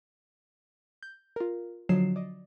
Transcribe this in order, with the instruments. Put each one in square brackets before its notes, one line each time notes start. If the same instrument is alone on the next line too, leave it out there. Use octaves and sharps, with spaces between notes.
[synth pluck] G6
F4 A#4
D3 F3 F#3 D#5 C7 E7
D5 D#5